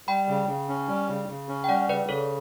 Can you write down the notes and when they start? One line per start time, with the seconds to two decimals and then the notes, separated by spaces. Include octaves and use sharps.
0.07 G3 G5 B5
0.28 C#3
0.48 C#3
0.69 C#4
0.88 G3
1.09 C#3
1.29 C#3
1.49 C#4
1.64 G5
1.69 G3 D5 F#5
1.89 C#3 B4 D5
2.09 C#3 A4 C#5